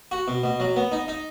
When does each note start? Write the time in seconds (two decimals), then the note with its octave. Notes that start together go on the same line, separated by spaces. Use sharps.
0.11 F#4
0.28 B2
0.44 B2
0.60 F#3
0.76 B3
0.92 D#4
1.08 D#4